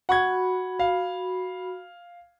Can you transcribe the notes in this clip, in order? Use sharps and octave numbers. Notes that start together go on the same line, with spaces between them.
F#4 F#5 B5 C#6 G#6
F5